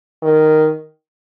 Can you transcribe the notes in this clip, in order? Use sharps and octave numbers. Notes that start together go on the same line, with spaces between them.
D#3